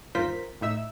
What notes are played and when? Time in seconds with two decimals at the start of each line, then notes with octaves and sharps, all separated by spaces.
0.15 G1 D#2 F4 A#4 C5 B6
0.61 A2 D#4 E5 E6